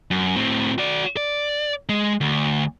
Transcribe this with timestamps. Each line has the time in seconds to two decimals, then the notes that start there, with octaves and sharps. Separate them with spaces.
0.11 F#2
0.36 A2 C4
0.78 F#4 D5
1.17 D5
1.89 G#3
2.21 D2